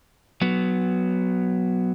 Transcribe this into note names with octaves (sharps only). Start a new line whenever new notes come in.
F#3 B3